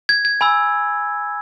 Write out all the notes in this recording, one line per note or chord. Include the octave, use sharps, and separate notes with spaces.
G#6
G#6
G#5 B5 E6